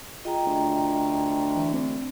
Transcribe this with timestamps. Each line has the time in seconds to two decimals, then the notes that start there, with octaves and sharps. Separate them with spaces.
0.25 F4 G#4 D#5 G5 A#5
0.46 D2
1.56 E3 A3
1.73 D2 C4 D4